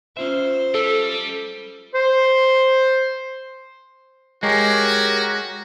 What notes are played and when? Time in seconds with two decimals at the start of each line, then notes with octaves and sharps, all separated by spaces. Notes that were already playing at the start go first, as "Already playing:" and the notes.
0.17 C#4 F4 C5 E5
0.75 G3 A4
1.95 C5
4.43 G#3 F#4 G4 A#4 C#5